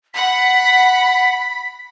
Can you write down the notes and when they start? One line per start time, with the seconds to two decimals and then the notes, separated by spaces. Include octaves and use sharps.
0.14 F#5 B5 B6